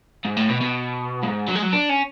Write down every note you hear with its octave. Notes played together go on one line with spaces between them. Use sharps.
G#2
A2
B2
B2
G#2
F#3
G#3
F#3
D4
C#4